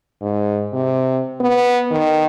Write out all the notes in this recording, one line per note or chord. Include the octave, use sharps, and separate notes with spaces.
G#2
C3
B3
D#3